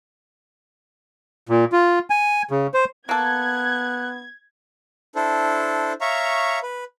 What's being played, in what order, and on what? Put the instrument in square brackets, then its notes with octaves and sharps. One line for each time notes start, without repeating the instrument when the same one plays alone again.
[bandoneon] A#2
F4
G#5
C#3
C5
[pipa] A#3 A4 [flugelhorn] B3 [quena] F#6 [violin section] G#6
[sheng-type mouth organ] D4 E4 A4 C5
C#5 E5 F5 A#5 C#6
B4